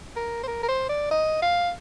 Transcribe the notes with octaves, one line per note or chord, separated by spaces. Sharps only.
A#4
C5
A#4
A#4
C5
D5
D#5
F5